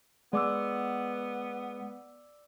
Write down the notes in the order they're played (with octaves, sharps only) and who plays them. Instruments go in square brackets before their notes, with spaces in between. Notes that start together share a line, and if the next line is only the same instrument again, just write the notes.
[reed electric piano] G#3 [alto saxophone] B3 [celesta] D5 D6 E6